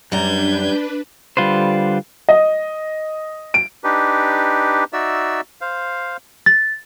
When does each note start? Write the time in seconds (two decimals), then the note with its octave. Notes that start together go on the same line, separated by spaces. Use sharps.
0.12 F#2 G3 D4 B4 A#5 G6 G#6
1.37 D3 G3 F4 B4 C5
2.29 D#5
3.54 D7
3.84 D4 D#4 G4 B4
4.93 D#4 F#4 D5 E5 E6
5.61 C5 F5
6.46 A6